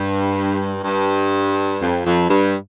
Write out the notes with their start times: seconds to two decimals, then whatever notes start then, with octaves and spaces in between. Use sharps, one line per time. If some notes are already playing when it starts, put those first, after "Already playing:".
Already playing: G2
0.84 G2
1.81 F2
2.05 F2
2.29 G2